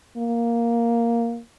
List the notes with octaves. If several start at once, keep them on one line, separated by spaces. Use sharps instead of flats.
A#3